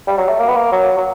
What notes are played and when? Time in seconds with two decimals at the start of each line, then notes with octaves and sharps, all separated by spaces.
0.07 G3
0.17 F#3
0.28 A3
0.40 A#3
0.48 B3
0.55 A#3
0.72 F#3
0.97 F#3